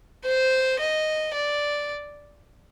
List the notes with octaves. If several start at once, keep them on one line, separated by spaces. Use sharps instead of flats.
C5
D#5
D5